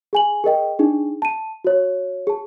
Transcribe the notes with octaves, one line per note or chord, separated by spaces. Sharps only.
G#4 G#5 F#7
G#4 A#4 D#5 G5
D4 D#4 G#4
A5 D#7
F#4 C#5
G#4 A5